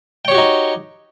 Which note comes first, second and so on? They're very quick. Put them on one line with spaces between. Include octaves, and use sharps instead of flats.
G5 C#5 G4 F#4 D#4